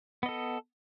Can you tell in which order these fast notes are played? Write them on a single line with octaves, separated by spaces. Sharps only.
B3 D#5 A4